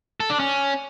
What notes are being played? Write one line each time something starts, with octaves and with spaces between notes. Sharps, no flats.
A4
D4
C#4